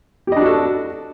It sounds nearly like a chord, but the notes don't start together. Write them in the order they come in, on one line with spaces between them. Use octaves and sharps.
G4 D#5 D4 F#4 A4